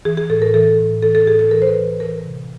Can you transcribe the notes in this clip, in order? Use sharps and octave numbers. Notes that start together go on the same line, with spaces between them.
E3 G#4
G#4
A2 A4
A#4
E3 A4
A2
E3 A4
A4
A2 G#4
A4
E3 A#4
C5
B4
E3
E3 A#4
C3